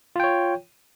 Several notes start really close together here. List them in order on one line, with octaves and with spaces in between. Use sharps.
F4 G5 C#5